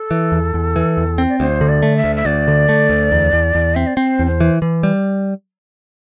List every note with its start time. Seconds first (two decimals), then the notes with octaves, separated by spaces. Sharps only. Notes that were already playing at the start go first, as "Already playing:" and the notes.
Already playing: A4
0.11 E3
0.32 E2
0.54 E2
0.76 E3
0.97 E2
1.18 C4
1.29 D5
1.40 D2 C5
1.61 D3
1.69 D5
1.82 A3
1.97 E5
2.04 D2
2.16 E5
2.25 D2 D5
2.48 D3
2.69 A3
2.90 D2
3.12 E2
3.33 E2
3.55 E2
3.75 C4 E5
3.87 D5
3.97 C4 C5
4.19 E2
4.26 C5
4.40 E3
4.62 E3
4.83 G3